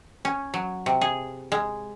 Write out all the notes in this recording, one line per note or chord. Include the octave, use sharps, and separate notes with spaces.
C#4
F#3
C3
G#4
G#3